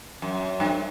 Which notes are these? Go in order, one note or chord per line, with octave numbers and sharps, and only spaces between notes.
F#2
G2